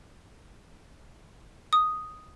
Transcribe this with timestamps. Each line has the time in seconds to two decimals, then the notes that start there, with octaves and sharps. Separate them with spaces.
1.73 D#6